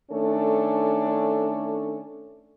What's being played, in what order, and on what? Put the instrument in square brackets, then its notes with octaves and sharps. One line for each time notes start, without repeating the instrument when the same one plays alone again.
[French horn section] D#3 A3 C#4 D4 A4